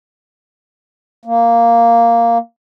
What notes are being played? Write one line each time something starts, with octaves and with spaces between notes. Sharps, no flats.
A#3